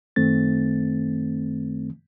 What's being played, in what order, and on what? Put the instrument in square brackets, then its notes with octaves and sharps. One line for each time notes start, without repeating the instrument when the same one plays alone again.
[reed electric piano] F#2 D#3 A3 C4 A6